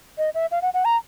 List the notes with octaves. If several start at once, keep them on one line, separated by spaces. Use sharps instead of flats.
D#5
E5
F5
F#5
F#5
A#5